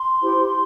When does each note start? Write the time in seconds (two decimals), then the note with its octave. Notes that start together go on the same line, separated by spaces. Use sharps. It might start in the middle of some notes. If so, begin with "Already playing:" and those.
Already playing: C6
0.22 E4 G4 C5